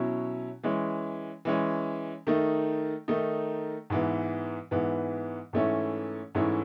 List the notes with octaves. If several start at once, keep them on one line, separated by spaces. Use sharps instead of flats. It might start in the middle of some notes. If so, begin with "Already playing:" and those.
Already playing: B2 F#3 C#4 E4
E3 G#3 C#4
E3 G#3 C#4
D#3 A3 D#4
D#3 A3 D#4
G#2 E3 B3
G#2 E3 B3
G#2 E3 A3 C#4 E4
G#2 E3 A3 C#4 E4